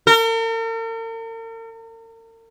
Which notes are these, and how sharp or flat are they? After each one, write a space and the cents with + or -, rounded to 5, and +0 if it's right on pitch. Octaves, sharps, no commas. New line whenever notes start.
A#4 -45